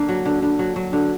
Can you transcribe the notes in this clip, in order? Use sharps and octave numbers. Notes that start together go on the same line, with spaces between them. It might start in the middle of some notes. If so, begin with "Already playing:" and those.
Already playing: D3 A#3
F#3
D3
D3
F#3
F#3
D3